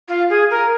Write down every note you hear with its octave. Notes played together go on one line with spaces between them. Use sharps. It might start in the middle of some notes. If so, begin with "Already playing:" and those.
F4
G#4
A#4